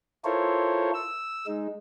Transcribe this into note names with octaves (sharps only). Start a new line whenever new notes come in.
E4 F4 A4 A#4 C5 C#5
E6
G#3 D#4